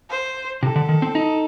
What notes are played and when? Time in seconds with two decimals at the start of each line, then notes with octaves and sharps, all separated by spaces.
0.10 C5
0.63 C3 A4
0.76 D3
0.89 D#3
1.02 C4
1.15 D#4